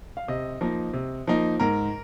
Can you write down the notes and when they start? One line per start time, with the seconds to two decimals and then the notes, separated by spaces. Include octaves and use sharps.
0.17 F5
0.28 C3 D#5
0.61 F3 A#3 D#4
0.93 C3
1.28 F3 A#3 D#4
1.60 G#2 A#4